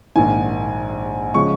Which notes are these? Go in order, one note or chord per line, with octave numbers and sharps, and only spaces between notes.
A#1 G#2 D#3 G#5
C#3 F3 G#3 C#6